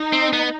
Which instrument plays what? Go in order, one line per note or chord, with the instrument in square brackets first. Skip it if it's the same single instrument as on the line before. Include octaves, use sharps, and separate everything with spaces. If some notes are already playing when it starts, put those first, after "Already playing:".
Already playing: [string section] D#4
[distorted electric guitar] C4
B3